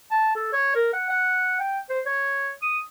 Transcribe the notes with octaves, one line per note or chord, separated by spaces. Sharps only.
A5
A4
C#5
A#4
F#5
F#5
G5
C5
C#5
D#6